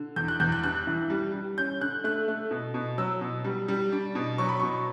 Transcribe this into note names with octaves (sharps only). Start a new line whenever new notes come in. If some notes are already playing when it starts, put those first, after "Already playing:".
Already playing: D3
E2 G6
F#6
E2 G6
F#6
G2 F#6
E3
G3
G3
C#4 G6
D3 F#6
A3 F#6
A3
B2
B2
F#3 E6
B2
G3
G3
D4
B2
F#3 C#6
B5
B2 C#6